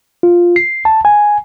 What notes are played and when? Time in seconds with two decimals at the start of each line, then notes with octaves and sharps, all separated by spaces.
0.23 F4
0.56 C7
0.85 A5
1.05 G#5